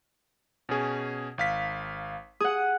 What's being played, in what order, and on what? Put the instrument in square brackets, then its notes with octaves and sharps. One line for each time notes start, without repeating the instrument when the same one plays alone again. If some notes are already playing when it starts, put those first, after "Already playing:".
[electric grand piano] B2 C#4 G#4
G#1 F5 B6
[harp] G#4 F#5 [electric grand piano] D#6